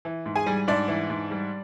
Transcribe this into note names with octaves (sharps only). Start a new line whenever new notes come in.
E3
G#2
G#4 G#5
G3
G#2 D4 D5
E3
G#2
G3